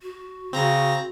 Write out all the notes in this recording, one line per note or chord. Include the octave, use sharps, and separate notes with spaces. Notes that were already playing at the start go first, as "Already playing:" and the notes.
F#4
C#3 C4 A#5 A#6